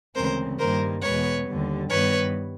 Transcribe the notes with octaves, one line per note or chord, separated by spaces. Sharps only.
D2 C#3 E3 G#3 C4 A#4 C5
G2 D#3 G3 A#3 A#4 C5
E2 B2 G#3 B3 B4 C#5
D#2 D3 G3
G2 D#3 G3 B3 B4 C#5